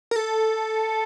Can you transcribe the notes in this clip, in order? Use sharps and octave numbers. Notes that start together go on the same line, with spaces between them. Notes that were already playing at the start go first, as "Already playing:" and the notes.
A#4
A4